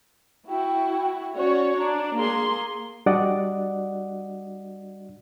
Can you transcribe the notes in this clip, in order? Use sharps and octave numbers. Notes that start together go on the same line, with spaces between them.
E4 F#4 G5
C#4 F#4 C#5 D5
D4 A#5
A#3 G#4 C6
G3 D4 F#4 D5 D#5 F#5